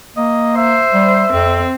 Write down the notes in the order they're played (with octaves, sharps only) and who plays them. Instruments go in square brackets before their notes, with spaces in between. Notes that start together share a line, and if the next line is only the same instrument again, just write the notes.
[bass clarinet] A#3 [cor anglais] D#5
[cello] C5 [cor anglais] E5
[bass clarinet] G3
[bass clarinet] F2 [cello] C4